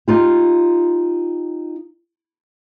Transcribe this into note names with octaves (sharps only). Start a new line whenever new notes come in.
D#4 F4 G4